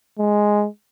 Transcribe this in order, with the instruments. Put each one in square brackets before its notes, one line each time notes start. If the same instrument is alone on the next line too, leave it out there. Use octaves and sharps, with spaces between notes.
[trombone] G#3